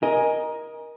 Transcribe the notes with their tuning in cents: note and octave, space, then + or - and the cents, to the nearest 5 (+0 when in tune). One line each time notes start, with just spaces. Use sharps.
A#4 +20 D#5 +0 G#5 +0